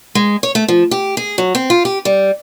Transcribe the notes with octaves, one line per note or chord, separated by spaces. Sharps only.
G#3
C#5
A3
F3
G4
G#4
F#3
C4
F4
G4
G3